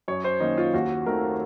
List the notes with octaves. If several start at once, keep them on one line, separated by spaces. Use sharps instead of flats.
F#2 C#5
C5
D#3 A#3 C#4 D#4
F4
D#2 F#4
D#3 A3 C4 A#4